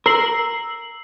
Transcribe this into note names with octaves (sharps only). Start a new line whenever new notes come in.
A#4 E6 C7 F#7